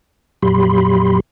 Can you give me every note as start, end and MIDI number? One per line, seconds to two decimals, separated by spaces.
0.42 1.20 41
0.42 1.20 46
0.42 1.20 54
0.42 1.20 67
0.42 1.20 83
0.42 1.20 84